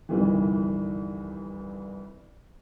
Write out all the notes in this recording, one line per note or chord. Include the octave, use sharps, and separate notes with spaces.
G1 C2 F2 D#3 E3